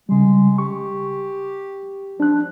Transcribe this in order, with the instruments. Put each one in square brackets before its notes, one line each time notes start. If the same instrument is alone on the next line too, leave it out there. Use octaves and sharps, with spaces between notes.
[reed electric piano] C#3 G3 [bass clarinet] G#3
[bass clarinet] G4 [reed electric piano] C#6
[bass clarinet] F3 [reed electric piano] D4 F#6